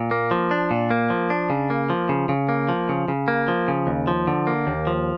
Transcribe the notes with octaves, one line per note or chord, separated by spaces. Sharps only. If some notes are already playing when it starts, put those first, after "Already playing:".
Already playing: A#2
A#3
F3
D4
A#2
A#3
F3
D4
C#3
A#3
F3
C#3
C#3
A#3
F3
C#3
C#3
A#3
F3
C#3
D#2
F3
D3
A#3
D#2
F3